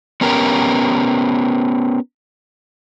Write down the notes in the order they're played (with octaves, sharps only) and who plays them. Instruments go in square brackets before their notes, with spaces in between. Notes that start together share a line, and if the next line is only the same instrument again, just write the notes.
[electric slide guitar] B3 C#4 G4 A#4